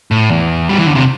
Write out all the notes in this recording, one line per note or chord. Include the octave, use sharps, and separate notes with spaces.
A2
E2
G3
E3
D3
C3